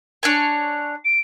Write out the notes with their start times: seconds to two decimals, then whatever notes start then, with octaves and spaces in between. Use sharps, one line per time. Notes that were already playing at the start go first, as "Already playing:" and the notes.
0.23 D4 C#5 G#5
1.05 D7